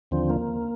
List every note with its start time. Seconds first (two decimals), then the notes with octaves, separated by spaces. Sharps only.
0.11 D#2 D3 F3 C4
0.30 A#3